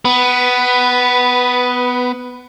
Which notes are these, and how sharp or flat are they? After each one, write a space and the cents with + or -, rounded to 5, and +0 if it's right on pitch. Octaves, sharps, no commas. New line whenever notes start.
B3 +15 B4 +0